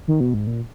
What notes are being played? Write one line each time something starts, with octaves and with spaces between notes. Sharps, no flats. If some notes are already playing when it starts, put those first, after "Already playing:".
D#3
B2
G#2
A#2